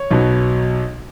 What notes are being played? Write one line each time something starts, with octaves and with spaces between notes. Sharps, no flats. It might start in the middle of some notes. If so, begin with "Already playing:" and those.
Already playing: C#5
B1 B2 F#3